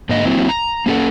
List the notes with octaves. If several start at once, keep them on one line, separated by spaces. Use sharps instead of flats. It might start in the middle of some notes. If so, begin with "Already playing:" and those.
G#2 D3 A#3 D#5
F#3 A#3 C4 E4
A#5
A#3 C#4 G4 A4 F#5